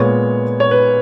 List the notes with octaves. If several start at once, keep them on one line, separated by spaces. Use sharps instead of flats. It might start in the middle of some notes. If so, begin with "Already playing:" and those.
Already playing: A#2 G#3 B3 C#5
C#5
B4